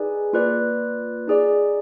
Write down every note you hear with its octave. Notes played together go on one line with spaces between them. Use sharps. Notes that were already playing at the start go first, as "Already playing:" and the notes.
Already playing: D#4 G#4 B4 D5 G#5
A#3 F4 B4 D5
D#4 G#4 D5